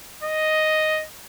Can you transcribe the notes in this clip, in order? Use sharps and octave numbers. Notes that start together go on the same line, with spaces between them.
D#5